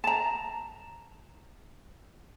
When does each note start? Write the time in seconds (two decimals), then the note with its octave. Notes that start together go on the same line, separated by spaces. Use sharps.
0.04 A5 A#5